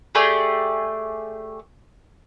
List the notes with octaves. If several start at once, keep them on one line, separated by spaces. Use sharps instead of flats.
A3 G4 G#4 D5